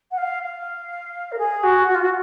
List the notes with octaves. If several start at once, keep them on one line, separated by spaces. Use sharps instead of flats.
F#5
F5
F5
A#4
G#4
F#4
F#4
F4
F#4